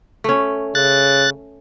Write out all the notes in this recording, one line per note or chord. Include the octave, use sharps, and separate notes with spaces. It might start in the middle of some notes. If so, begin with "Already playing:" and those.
A3 C#4
C#3 F#6 A6